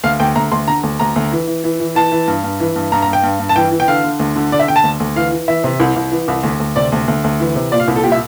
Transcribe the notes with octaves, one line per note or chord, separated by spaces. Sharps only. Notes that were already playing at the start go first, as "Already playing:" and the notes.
D2 F5
D2 G5
D2 A#5
D2 C6
D3 A#5
D2
D2 A#5
D2
E3
E3
E3
E3
E3 A5
E3
G2
G2
E3
G2
G2 A#5
A#5
G2
G5
G2
G2
A5
E3 G5
E3
G5
D3 F5
D3
D2
D3
D3 D5
E5
D3 G5
A5
D2
D2
E3 F5
E3
E3 E5
C3
C2
C2
E3
C2
D2
D2
C3 D5
D2
D2
D2
E3
C3
A#2 D5
F5
C2
A4
A#2 G4
E5